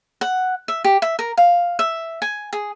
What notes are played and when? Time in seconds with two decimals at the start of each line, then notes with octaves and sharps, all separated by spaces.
0.21 F#5
0.68 E5
0.84 G4
1.02 E5
1.19 A#4
1.37 F5
1.79 E5
2.22 G#5
2.53 G#4